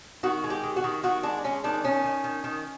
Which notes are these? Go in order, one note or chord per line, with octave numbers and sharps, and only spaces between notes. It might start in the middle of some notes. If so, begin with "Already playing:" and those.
D#3 F#4
G#3
G4
D#3
F#4
D#3
D#3 F#4
G#3 D4
G#3 C#4
D#3 D4
D#3 C#4
D#3
D#3
D#3